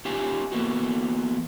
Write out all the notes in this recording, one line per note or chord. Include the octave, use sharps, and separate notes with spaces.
C#4 D#4 F4 G4 G#5
E3 A#3 B3 F#4